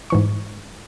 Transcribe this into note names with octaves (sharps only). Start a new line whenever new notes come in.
G#2 E3 C#6